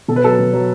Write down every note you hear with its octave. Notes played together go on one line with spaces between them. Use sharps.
B2 A4
B4
F#3 A4
B2
F#3